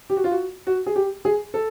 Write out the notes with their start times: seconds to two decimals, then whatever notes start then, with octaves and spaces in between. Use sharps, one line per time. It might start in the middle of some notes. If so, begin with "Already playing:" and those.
0.10 G4
0.17 F#4
0.24 F4
0.31 F#4
0.67 F#4
0.86 G#4
0.96 G4
1.25 G#4
1.54 A4